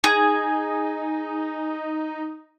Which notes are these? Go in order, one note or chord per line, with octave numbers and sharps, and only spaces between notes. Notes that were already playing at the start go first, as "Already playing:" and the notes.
D#4 G#4